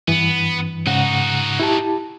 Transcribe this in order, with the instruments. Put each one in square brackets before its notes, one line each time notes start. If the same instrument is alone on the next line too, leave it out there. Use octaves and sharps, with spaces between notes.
[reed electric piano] G2 E3 [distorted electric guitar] B3
[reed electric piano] G#2 C#3 F#5 [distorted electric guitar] D#4 F#4
[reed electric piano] E4 G4 A5